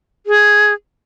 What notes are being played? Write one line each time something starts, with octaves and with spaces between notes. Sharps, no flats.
G#4